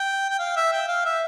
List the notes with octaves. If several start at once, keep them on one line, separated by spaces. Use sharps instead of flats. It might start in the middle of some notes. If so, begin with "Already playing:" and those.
Already playing: G5
G5
F5
E5
G5
F5
E5